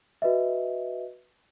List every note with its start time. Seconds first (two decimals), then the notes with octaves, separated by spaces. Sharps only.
0.22 F#4 B4 D#5 E5